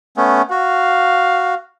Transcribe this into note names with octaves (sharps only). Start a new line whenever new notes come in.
A3 B3 C#4
F#4 F5